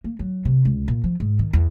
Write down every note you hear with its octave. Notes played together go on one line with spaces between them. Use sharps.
A#3
F#3
C3
C#2
A#2
F3
G#2
D#3
E2